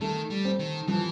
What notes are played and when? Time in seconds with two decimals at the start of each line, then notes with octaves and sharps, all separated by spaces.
0.01 D#3 A3
0.30 G3
0.45 C4
0.59 D#3
0.88 E3 F3